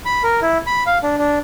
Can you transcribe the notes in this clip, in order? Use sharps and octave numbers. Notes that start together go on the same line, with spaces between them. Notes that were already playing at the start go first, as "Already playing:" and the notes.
B5
A#4
E4
B5
F5
D4
D4